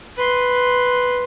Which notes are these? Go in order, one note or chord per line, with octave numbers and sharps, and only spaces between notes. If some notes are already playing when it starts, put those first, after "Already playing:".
B4 C6